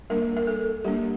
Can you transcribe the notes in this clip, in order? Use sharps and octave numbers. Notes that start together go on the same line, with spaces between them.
G3 A#3 D4 A#4
A#4
A4
G3 A#3 D4 G4